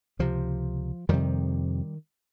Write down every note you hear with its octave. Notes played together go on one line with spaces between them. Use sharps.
C#2 C3 F3
F2 C3 D#3 G3